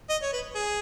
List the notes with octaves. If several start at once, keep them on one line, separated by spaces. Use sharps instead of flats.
D#5
C#5
B4
G#4